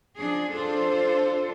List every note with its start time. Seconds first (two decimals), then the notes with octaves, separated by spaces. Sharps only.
0.19 F3 D4 G#4
0.53 D4 F4 A4 C5